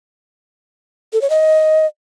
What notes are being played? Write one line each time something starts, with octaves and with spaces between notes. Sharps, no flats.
A4
C#5
D#5